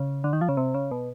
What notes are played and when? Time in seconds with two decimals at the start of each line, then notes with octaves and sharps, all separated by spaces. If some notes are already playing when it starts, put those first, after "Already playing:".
Already playing: C#3
0.24 D3
0.33 D#3
0.41 F3
0.49 C#3
0.57 C3
0.74 C#3
0.91 B2